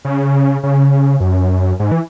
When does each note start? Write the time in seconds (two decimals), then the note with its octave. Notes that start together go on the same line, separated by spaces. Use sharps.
0.05 C#3
0.63 C#3
1.20 F#2
1.79 G#2
1.91 E3